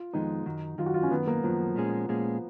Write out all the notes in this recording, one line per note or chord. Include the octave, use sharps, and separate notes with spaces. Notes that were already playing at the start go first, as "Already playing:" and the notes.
Already playing: F4
F2 D#3 G#3 B3 D#4
F#2 D#3 F#3
F#2 D#3 F#3 F4
F#4
F4
C#4
F#2 D#3 F#3 B3
A#3
F#2 D#3 F3 F#3
A#2 G#3 C#4 G#4
A#2 G#3 C#4 G#4